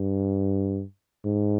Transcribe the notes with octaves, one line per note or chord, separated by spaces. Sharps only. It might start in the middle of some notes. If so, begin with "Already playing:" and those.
Already playing: G2
G#2